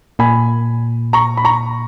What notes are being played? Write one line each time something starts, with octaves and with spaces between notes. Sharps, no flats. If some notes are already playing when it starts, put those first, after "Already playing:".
A#2 G#5 B5
A#5 C#6
B5
A#5 C#6